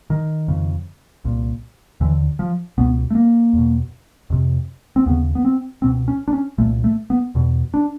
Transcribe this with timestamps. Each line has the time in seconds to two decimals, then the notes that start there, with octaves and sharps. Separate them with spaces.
0.10 D#3
0.48 F2 C#3
1.24 C2 A#2
2.00 D#2 D3 E3
2.39 F3
2.78 C#2 B2 B3
3.10 A3
3.15 A#3
3.53 E2 B2
4.30 F2 C3
4.96 C4
5.06 D#2 C#3 B3
5.35 B3
5.45 C4
5.82 C#2 B2 C4
6.08 C#4
6.28 D4
6.33 C#4
6.58 C2 A#2 A3
6.84 A3
7.10 B3
7.35 E2 B2
7.74 D4